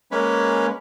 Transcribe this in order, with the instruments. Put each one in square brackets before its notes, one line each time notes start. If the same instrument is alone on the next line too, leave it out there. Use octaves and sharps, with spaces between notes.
[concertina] G#3 A#3 C#4 B4